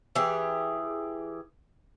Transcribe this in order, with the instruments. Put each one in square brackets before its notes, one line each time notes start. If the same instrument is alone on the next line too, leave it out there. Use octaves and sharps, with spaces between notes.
[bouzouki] E3 G4 G#4